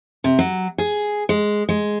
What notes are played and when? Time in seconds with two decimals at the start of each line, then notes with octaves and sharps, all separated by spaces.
0.24 C3
0.39 F#3
0.78 G#4
1.29 G#3
1.69 G#3